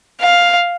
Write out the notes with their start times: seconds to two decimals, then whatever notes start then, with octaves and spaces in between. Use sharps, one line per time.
0.21 F5